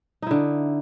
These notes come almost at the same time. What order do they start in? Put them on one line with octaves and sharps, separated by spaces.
D#4 E4 D3